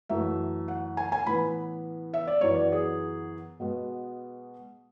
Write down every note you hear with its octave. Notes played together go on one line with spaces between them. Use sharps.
F#2 E3 A3 E5
F#5
G#5
G#5
A2 E3 B3 B5
E5
D5
F#2 E3 B3 C#5
D5
G#4
B2 G#3 B3